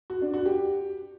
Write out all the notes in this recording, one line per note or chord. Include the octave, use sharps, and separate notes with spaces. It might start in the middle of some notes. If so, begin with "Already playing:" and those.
F#4
D4
F#4
G4